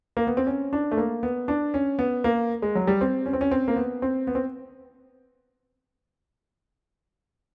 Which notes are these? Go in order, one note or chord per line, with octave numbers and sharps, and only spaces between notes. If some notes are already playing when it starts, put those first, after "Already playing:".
A#3
B3
C4
C#4
D4
A3
A#3
B3
D4
C#4
B3
A#3
G#3
F#3
G3
C4
C#4
C4
C#4
C4
A#3
B3
C4
B3
C4